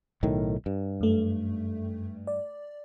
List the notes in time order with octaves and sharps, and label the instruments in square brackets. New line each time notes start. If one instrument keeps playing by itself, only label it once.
[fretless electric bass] B1 A2 D#3
G2
[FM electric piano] F#2 A3
D5